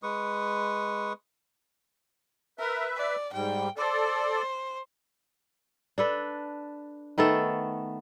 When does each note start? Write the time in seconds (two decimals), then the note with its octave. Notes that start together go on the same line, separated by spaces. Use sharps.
0.03 G#3 B4 C#6 D#6
2.59 A#4 B4 E5
2.97 D5
3.33 G#2 G3 G5
3.78 A4 C5 D5
5.98 D4 A4 B4
7.18 D#3 A3 B3 A4